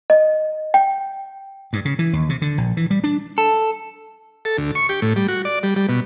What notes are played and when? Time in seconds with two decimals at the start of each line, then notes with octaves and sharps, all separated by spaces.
0.10 D#5
0.74 G5
1.73 G2
1.85 C#3
1.99 E3
2.13 D#2
2.29 C3
2.42 D3
2.58 A#1
2.77 E3
2.90 G3
3.04 D4
3.38 A4
4.45 A4
4.58 D2
4.75 C#6
4.89 G4
5.02 A2
5.16 G3
5.28 F#4
5.45 D5
5.63 G3
5.76 G3
5.89 B2